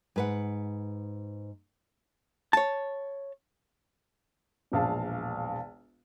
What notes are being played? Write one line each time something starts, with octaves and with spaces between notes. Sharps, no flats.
G#2 B4 F#5
C#5 A5
E1 A#1 F5 A5